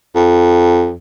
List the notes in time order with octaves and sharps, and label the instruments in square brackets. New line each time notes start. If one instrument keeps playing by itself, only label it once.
[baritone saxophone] F2